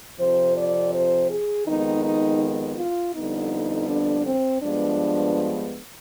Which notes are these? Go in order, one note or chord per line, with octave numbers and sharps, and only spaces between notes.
F2 C3 F3 C5
D5
C5
G#4
F2 D#3 G#3 B3 D#4
D#4
F4
F2 D3 G3 B3 D#4
D4
C4
G2 F3 G#3 B3 D4